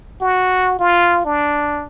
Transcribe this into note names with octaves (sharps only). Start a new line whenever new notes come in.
F#4
F4
D4